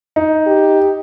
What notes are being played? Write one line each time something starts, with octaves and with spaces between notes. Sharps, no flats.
D#4
G4